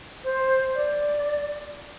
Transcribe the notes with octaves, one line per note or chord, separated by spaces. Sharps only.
C5
D5